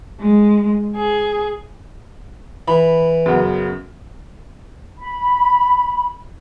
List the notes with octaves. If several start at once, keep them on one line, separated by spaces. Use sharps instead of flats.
G#3
G#4
E3 B5
F#2 C#3 B3
B5